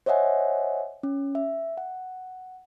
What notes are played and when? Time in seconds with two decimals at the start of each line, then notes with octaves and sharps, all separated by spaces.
0.06 C5 C#5 D#5 E5 F#5 G#5
1.03 C#4
1.35 E5
1.77 F#5